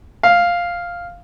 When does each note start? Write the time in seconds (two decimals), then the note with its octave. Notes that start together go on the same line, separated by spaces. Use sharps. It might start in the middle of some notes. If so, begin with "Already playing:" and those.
0.23 F5